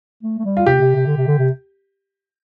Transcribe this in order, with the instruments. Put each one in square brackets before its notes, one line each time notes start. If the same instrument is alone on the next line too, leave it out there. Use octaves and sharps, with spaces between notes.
[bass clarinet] A3
A3
G3
[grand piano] F4
[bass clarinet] C3 [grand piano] G4
[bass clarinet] C3
C3
D3
C3
D3
C3